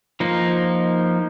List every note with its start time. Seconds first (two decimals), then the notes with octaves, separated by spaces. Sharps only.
0.20 F3 A#3 D#4